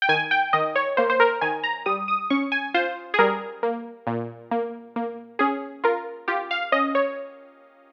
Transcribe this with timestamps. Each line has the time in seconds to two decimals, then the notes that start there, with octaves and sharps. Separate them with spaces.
0.02 G5
0.09 D#3 G#5
0.31 G5
0.53 D#3 D#5
0.76 C#5
0.97 A#3 C5
1.10 C5
1.20 A#4
1.41 D#3 G#5
1.64 A#5
1.86 G3 D#6
2.08 D#6
2.30 C#4 C#6
2.52 G#5
2.74 F4 C5
3.14 G#4
3.19 G3 A#4
3.63 A#3
4.07 A#2
4.51 A#3
4.96 A#3
5.39 C#4 G#4
5.84 F4 A#4
6.28 F4 G4
6.51 F5
6.72 C#4 D#5
6.95 C#5